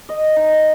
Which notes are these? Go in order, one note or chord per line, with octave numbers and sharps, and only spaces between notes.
D#5
D#4